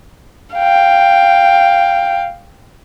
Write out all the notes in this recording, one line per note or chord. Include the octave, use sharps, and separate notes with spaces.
F5 G5